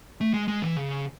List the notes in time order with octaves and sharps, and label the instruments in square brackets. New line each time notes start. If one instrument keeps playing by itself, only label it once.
[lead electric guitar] A3
G#3
G#3
E3
C#3